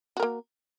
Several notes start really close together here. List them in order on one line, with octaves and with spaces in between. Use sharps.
F#4 A#4 A#3